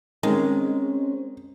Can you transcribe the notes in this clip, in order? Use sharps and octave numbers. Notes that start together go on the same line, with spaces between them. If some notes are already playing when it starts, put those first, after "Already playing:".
D#3 G#3 C4 C#4